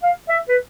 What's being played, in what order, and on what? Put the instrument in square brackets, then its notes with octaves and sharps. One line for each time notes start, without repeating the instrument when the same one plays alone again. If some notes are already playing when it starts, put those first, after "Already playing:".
[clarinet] F5
E5
B4